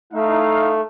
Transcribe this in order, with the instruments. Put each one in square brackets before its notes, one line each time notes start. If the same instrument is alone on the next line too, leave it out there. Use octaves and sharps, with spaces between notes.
[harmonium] A3 [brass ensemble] D#4 E4 F5